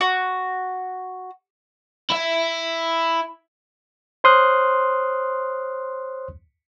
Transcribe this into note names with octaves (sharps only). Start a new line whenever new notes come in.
F#4
E4 E5
C5 C#5 C6 D#6 F6 F#6